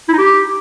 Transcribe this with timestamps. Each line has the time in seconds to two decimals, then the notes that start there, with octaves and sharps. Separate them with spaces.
0.08 E4
0.13 D#4
0.18 G4